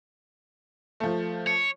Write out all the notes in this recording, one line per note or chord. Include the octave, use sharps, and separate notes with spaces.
F3 A3
C#5